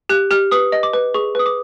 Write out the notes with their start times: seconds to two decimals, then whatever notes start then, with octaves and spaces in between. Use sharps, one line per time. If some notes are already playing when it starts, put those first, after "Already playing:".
0.09 G4 F#6
0.31 G4 F6
0.51 B4 D#6
0.72 D#5
0.83 D6
0.93 B4
1.14 G#4 C#6
1.35 B4 D#6
1.46 D6